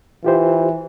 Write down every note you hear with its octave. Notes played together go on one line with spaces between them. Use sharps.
E3 F4 G4 C5